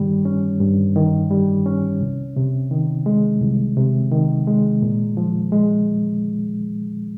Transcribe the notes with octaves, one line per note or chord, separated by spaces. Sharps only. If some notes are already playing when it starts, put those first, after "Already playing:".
Already playing: G2 D#3 G3
C#4
G2
D#3
G3
C#4
C2
C3
D#3
G#3
C2
C3
D#3
G#3
A#2
F3
G#3